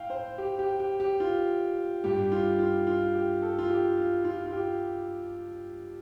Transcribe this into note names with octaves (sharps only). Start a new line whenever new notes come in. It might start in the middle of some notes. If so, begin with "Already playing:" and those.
Already playing: A2 F5 G5
C5
G4
G4
G4
G4
F4
G2 G3 G4
F4
F4
F4
G4
A4
F4
G4
F4
F4
F4
G4